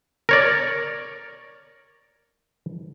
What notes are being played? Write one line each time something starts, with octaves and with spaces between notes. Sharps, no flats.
A#4 C#5 D5